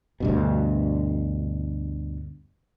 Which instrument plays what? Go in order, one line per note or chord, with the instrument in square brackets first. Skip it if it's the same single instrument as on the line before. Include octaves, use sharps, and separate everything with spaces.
[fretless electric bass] D2 G2 B2